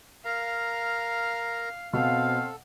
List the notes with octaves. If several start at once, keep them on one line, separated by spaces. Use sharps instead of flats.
A#4 F5 A#5
B2 C4 A4 F5